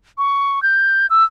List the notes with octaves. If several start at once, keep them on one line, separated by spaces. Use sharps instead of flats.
C#6
G6
E6